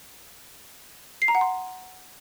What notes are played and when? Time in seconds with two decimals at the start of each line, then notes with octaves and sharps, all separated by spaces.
1.22 C7
1.28 A#5
1.35 F#5
1.41 C6